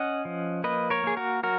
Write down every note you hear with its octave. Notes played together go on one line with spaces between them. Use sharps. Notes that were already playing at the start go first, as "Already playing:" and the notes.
Already playing: C#4 D#5 F#5
F3
A#3 B4 D#5
A#4 C#5
A#3 G#4
F#4 A#4
F#3 F#4 A#4